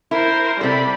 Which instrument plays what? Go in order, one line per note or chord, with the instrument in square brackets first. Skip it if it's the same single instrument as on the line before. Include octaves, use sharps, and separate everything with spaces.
[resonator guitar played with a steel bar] E4 [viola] A#4 C5
[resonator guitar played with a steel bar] C3 A4 [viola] G3 B5